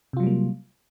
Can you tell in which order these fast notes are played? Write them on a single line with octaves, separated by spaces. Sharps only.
C3 F4 F#3 G3 A#3